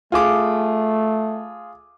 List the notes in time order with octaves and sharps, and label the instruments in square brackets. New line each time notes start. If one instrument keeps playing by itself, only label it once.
[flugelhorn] A3 [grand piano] F4 G#4 D6